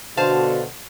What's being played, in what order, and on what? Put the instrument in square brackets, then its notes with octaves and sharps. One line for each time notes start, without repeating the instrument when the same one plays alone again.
[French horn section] B2 D3 F#4 [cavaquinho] C5 F5 A5